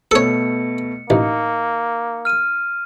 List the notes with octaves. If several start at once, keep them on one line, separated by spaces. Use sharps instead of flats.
B2 A3 A4 C#5 C#7
A1 A#3 D#4
F6 D#7